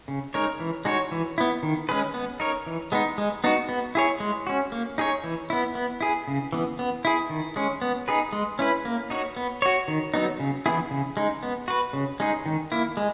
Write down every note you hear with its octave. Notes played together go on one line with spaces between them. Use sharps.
C#3
G#3 D#4 A#4 C#5
E3
G#3 D#4 F#4 C#5
E3
B3 E4
D#3
G#3 C#4 G#4 B4
B3
D#4 A#4 C#5
E3
G#3 B3 D#4
G#3
B3 D#4 F#4
B3
E4 G#4 C#5
G#3
C#4 F#4
A#3
D#4 G#4 C#5
E3
B3 E4
B3
E4 G#4
C#3
E3 B3
B3
E4 G#4
D#3
G#3 C#4
B3
D#4 G#4 B4
G#3
C#4 E4 B4
A#3
D#4 F#4 C#5
B3
F#4 C#5
D#3
F#3 B3 D#4
C#3
E3 B3 E4 G#4
C#3
G#3 D#4
B3
F#4 B4
C#3
G#3 D#4 G#4
D#3
A#3 E4
G#3